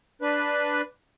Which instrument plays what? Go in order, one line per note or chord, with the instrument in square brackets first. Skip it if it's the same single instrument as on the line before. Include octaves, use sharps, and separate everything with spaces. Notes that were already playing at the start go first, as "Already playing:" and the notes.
[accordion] D4 B4